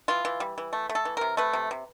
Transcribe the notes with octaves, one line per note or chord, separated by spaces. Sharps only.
E3 F4
E3
G3
E3
A3
A3
A4
E3
C3 A#4
A3 B4
C3
C3